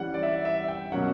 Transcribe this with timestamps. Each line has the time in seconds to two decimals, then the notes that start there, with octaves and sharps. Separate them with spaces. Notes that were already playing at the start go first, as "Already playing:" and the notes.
Already playing: E3 G3 C#4 F#5
0.14 D5
0.23 E5
0.45 E5
0.68 G5
0.92 B2 F#3 A#3 C#4 F#5